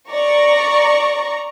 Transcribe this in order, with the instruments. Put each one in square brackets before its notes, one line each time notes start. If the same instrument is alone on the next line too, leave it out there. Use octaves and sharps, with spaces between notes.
[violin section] D5 A#5 C#6